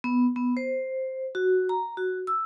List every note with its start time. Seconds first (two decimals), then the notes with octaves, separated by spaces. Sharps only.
0.04 B3
0.36 B3
0.57 C5
1.35 F#4
1.69 A#5
1.97 F#4
2.27 E6